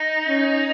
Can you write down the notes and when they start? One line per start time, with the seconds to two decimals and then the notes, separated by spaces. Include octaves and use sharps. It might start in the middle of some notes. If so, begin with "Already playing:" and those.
Already playing: D#4
0.27 C#4